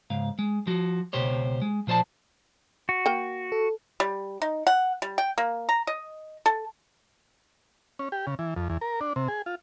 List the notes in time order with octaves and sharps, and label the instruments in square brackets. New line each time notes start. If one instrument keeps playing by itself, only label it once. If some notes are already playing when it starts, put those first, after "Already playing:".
[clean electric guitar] C#2 G#2 F5
G#3
F3 F#4
C#2 B2 G4 C5 C#5
G#3
A#2 F3 C5 D5 A5
[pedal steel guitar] F#4
[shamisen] A#3 G5
[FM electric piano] A4
[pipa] G3
D#4
F#5
G3
G5
A#3
A#5
D#5
A4
[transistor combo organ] C#4
G4
C#3
E3
F2
E2
A#4
D4
C3
G#4
F4